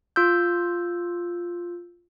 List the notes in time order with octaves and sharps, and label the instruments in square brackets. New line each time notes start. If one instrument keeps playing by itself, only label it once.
[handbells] F4 E6 G6